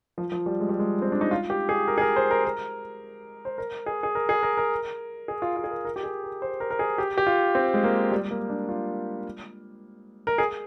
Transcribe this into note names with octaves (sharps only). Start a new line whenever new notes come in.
F3
F3
G3
G#3
G3
G#3
C4
D4
D#4
F4
G4
G#4
A#4
G#4
A#4
C5
A#4
A#4
C5
A#4
G#4
G#4
A#4
G#4
A#4
A#4
G#4
F4
F4
G#4
A#4
A#4
G4
G#4
A#4
C5
A#4
A#4
G#4
G4
G4
F4
C4
G#3
A#3
G3
A#3
D4
F4
A#4
G#4